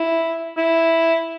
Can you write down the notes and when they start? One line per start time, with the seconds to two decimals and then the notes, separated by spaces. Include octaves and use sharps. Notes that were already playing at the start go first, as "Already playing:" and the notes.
Already playing: E4
0.57 E4